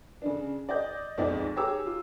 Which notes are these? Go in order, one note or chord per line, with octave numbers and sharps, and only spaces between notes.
C#3 D4
D5 D#5 G6
B1 F2 G#3 D#4 D5
G4 G#4 C#5 A#5 D6 E6
F4